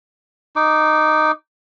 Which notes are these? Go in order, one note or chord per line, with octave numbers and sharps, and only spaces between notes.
D#4 D6